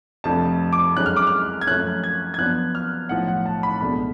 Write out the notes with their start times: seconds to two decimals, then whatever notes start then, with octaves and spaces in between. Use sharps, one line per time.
0.24 F1 F2 F3 A3 D4 A5
0.73 D6
0.96 F#2 D3 G#3 C#4 F#6
1.06 F6
1.16 D6
1.27 F6
1.61 G#6
1.67 F#2 F3 A3 C#4 F#6
2.04 G#6
2.34 G#6
2.38 F#2 F3 B3 D4 F#6
2.75 F6
3.09 B1 A2 F3 F#5
3.28 F#5
3.46 A5
3.63 B5
3.81 C#2 B2 A3 D4 B5